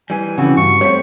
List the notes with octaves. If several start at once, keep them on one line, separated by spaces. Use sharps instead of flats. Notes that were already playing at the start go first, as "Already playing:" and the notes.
E3 G3 G#5
C#3 E3 C4 F#4
G2 C#6
G3 A3 C4 C#5